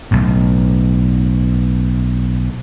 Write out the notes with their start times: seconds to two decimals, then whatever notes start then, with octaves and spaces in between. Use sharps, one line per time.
0.11 B1 A2